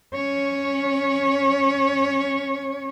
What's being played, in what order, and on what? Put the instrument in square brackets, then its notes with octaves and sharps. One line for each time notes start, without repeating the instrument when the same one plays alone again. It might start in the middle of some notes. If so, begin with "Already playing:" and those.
[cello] C#4 C#5